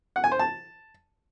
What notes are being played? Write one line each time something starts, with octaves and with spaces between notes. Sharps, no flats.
F#5
G#5
C5
A5